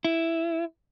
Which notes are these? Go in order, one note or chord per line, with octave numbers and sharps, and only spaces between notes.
E4